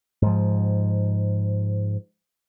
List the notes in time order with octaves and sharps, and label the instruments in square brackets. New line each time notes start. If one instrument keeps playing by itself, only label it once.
[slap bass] G#2 F3